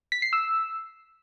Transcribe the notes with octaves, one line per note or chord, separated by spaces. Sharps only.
B6
C7
E6